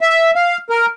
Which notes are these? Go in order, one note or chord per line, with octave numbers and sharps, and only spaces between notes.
E5
F5
A#4